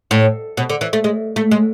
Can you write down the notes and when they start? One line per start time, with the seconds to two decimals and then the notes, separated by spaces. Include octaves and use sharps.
0.11 A2
0.57 B2
0.69 D3
0.81 E3
0.93 A3
1.04 G#3
1.36 A3
1.51 G#3